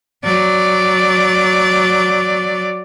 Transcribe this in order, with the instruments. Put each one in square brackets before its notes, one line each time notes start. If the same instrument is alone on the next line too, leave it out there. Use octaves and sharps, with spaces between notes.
[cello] F#3 D5